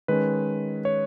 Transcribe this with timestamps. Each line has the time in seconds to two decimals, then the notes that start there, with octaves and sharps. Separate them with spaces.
0.08 D#3 G#3 C#4 B4
0.85 C#5